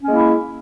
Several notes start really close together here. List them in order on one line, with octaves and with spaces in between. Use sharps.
C#4 A#3 G#3 E4